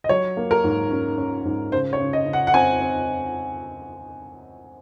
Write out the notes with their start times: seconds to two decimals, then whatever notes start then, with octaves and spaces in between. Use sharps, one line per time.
0.04 D#5
0.09 F#3 C#5
0.37 A#3
0.51 A#4
0.64 G#2
0.91 C#4
1.18 C#4
1.45 G#2
1.72 C#3 C5
1.93 C#5
2.00 C#3
2.13 D#5
2.26 C#3
2.33 F#5
2.47 F#5
2.54 C4 G#5
2.81 C4